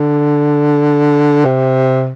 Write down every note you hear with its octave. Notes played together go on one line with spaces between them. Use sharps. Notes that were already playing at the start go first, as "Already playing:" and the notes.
Already playing: D3
C3